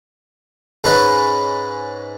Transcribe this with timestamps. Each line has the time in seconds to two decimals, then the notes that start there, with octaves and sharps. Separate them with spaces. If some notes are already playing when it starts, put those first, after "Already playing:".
0.84 G#2 G#3 C#4 B4